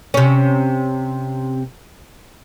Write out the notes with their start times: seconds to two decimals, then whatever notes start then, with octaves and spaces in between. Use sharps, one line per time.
0.14 C3 C#4